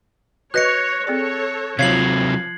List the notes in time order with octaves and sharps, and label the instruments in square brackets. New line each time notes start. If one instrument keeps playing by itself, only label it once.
[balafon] F#4 B4 D#5 [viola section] C#5 [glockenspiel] F#6 A#6 C#7
[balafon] C4 G#4 D5 [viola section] A4 C#5
[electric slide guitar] C3 F#3 [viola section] F3 [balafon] C#5 F5 [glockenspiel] G#6 C7 F#7